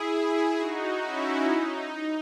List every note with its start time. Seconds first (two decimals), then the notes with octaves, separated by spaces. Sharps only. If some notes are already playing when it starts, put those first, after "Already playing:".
Already playing: E4 G#4
0.57 D#4 F#4
1.04 C#4 E4
1.51 D#4